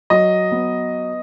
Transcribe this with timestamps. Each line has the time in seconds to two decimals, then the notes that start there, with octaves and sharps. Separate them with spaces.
0.10 F#3 D#5
0.52 B3